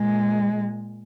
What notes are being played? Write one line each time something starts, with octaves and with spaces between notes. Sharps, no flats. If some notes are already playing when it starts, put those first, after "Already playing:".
Already playing: A#2 G#3